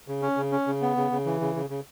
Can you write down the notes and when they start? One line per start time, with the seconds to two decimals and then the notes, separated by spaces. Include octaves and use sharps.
0.08 C#3
0.22 C#4
0.37 C#3
0.52 C#4
0.67 C#3
0.82 B3
0.97 C#3
1.11 C#3
1.25 E3
1.41 C#3
1.55 C#3
1.70 C#3